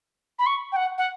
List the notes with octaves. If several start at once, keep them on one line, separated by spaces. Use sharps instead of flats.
B5
C#6
G5
F#5
F#5